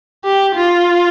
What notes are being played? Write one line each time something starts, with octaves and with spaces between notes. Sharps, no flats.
G4
F4